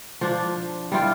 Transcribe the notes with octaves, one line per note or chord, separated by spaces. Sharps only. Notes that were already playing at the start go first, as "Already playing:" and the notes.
F3 D4
G3 E4 F4 G5